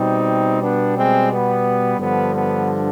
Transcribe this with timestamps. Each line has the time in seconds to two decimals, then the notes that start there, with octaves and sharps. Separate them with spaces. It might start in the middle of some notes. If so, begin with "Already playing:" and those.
Already playing: B2 G3 C4 D#4
0.60 B3 D4
0.95 G#3 C4
1.29 B3
1.97 G2 D3 F3 B3
2.32 B3